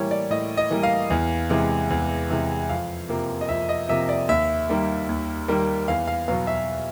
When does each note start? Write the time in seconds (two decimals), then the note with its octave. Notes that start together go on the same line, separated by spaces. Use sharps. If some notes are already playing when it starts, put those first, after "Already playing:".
Already playing: A2 E3 G3 A#3 C#5
0.11 D5
0.30 A2 D#5
0.57 D#5
0.70 E3 G3 A#3
0.83 F5
1.10 E2
1.50 C3 E3 G#3
1.90 E2
2.30 C3 E3 G#3
2.69 F2 F5
3.09 C3 F3 A#3
3.41 D#5
3.49 F2 E5
3.69 D#5
3.89 C3 F3 A#3 E5
4.09 D5
4.28 D#2 E5
4.69 D#3 G3 A#3
5.09 D#2
5.48 D#3 G3 A#3
5.88 E2 F5
6.07 F5
6.28 B2 F#3 B3 F5
6.47 E5